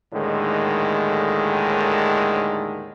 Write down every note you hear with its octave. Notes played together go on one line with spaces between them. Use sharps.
D#2 A2 D3 D#3 G#3